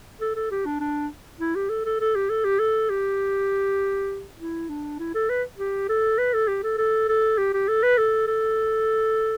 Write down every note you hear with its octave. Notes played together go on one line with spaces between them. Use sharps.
A4
A4
G4
D4
D4
E4
G4
A4
A4
A4
G4
A4
G4
A4
G4
E4
D4
E4
A4
B4
G4
A4
B4
A4
G4
A4
A4
A4
G4
G4
A4
B4
A4
A4